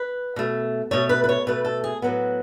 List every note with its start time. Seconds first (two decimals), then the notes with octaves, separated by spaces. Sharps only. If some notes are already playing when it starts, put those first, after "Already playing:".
Already playing: B4
0.36 B2 A3
0.91 B2 A3 C#5
1.09 B4
1.24 B4
1.29 C#5
1.47 B2 A3 B4
1.65 A4
1.84 G#4
2.02 A2 F#3 B3